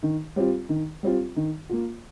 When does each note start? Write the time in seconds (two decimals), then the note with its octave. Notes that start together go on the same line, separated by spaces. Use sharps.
0.03 D#3
0.36 G3 C4 F4
0.69 D#3
1.03 G3 C4 F4
1.36 D#3
1.69 A#3 F4